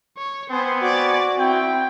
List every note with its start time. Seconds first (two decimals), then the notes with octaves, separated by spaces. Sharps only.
0.18 C#5
0.50 B3 C4 C5 G#5
0.83 F#4 D5 A6
1.37 C4 E4 G5